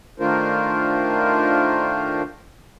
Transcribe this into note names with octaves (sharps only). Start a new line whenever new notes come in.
D#3 A3 D4 F4 A#4 C5